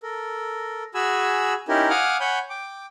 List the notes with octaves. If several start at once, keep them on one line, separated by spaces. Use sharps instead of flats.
A4 A#4
F#4 G#4 G#5 B5 E6
C#4 D#4 E4 G4 A#4
F5 F#5 G#5 D6 D#6 F6
C#5 F#5 G#5 B5 G6
G5 D6